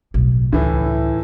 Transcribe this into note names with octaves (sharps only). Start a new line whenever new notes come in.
B1 A2
C#2 A2 E3